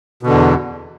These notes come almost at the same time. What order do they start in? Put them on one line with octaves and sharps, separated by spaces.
B2 D3 E2